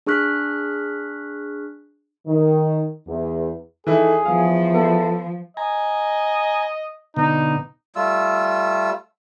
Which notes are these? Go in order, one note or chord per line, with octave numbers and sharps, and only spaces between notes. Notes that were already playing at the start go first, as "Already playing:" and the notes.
D4 G#4 C#6 F6 F#6 B6
D#3
E2
E3 D#4 E4 G#4 A4
E2 F3 F5
B3 A4
D#5 G#5 A#5
B2 D3 D#4
G3 A3 F4 E6